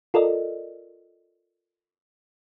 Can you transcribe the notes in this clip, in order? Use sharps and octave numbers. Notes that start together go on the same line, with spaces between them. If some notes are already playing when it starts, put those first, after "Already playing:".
F4 A4 A#4 D5 D#5